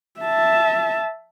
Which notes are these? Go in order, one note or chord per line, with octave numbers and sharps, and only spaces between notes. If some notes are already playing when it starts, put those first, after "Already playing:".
E5 A5